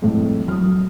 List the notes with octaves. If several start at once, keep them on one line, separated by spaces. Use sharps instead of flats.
F2 A2
F#3 D#6 F6